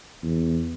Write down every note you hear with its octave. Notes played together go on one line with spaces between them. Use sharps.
E2